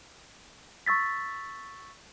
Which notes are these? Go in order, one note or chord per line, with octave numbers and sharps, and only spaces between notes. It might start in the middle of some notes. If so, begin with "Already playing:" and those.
C#6 E6 A6 B6